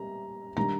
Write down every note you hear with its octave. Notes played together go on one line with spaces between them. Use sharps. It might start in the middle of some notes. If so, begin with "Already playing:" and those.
Already playing: G3 A#5
D#3 G3 D4 A#5